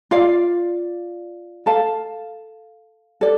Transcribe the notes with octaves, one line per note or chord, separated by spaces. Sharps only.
F4 D5 F5
A4 F5 A5
A4 D5